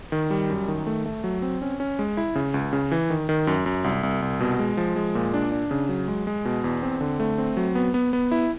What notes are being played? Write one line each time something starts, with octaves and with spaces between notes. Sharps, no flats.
D#3
G3
F#2
D#3
A3
A3
F#3
C4
C#4
C#4
G#3
E4
C#3
C#2
C#3
E3
D#3
D#3
F#2
F#2
C2
C2
C2
B2
G#3
F3
G#3
A#2
D4
D4
C#3
F#3
G#3
G#3
B2
E2
C4
D3
A3
C4
F#3
B3
B3
B3
E4